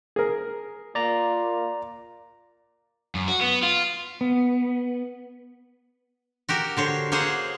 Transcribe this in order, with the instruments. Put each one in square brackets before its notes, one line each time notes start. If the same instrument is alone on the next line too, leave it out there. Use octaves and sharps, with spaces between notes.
[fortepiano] G#4 A#4
[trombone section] A#3 F4 [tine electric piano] D5 A#5
[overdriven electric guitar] F#2
F#4
B3
F4
[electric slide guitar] B3
[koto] F#4 G4 A#4
D3 C5 C#5
A#3 G#4 C5 C#5 F#5